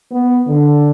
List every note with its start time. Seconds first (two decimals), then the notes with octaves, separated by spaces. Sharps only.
0.12 B3
0.47 D3